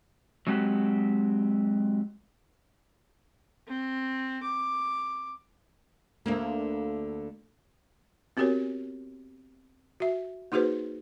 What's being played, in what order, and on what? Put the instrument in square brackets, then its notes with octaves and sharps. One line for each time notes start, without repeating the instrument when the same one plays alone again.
[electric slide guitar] F#3 G#3 C4 F#4 G4
[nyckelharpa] C4
D6
[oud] D2 D3 A#3
[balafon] B3 C4 F#4 G4 A#4 C#5
F#4 E5
A#3 D#4 F#4 G#4 B4 C5